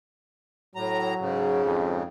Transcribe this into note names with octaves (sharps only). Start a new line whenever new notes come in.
A2 F#3 A#5
G#2 C#3
F2